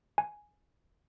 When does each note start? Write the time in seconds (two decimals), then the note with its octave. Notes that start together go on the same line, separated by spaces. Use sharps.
0.18 G#5